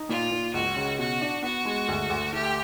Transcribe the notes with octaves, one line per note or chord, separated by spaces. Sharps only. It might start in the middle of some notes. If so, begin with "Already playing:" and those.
Already playing: D#4
A#2 F4
A#2
C#2 F#4
C#3
B2 F#4
D4
B3 F#4
G#3
D2
D2
A3 G4